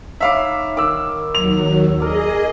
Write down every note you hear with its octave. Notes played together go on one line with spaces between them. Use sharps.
D#4 C#5 E5 F5 B5 D6
D#3 D6 E6
D#2 F#3 F7
G#4 A#4 D5 D#5